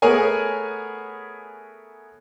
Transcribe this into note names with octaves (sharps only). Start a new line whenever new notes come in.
A3 B3 G#4 A#4 C#5 G#5